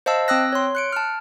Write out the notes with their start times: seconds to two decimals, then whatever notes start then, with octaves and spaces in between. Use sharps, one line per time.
0.06 C5 D#5 F5 A5 E6
0.28 C4 G5 D#6 E6 F#6 A#6
0.53 C#5 C6
0.75 F#6 C#7 D7
0.93 A5 F6